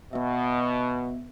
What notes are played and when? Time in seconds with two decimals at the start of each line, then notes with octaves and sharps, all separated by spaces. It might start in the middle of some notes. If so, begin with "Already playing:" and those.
0.13 B2 B3 E5